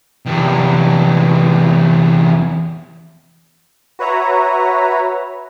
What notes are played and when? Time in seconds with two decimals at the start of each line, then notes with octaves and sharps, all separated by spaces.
0.26 E2 C3
3.99 F#4 B4 C#5 E5 A#5